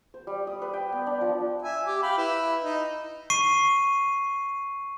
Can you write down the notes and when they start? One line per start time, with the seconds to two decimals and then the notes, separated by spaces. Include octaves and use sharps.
0.14 C5
0.27 G3
0.47 D#6
0.62 B4
0.73 G5
0.92 B3
1.07 D4
1.21 F3
1.62 E5 G#5
1.86 G4 D6
2.03 F5 G5 B5
2.18 E4 B4
2.63 D#4
3.30 C#6 C7 D#7